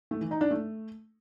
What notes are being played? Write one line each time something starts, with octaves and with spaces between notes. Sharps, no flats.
A3
E3
D#4
D4
A3